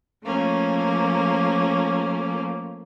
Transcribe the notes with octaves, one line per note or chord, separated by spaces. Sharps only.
F3 A3 A#3 C#4